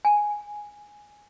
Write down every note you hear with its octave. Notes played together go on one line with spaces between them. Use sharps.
G#5